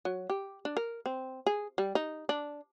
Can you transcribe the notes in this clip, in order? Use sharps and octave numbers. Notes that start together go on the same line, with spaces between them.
F#3
G4
D4
A#4
C4
G#4
G3
D#4
D4